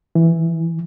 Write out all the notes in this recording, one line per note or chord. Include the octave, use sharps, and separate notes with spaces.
E3